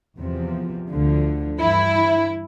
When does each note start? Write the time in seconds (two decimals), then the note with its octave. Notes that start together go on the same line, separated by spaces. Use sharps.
0.17 E2 C3 F3
0.88 D2 D3 F3
1.59 G2 E3 E4